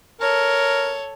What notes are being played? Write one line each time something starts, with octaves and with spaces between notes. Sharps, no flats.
A4 A#4 C#5